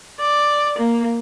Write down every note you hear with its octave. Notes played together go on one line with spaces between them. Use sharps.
D5
A#3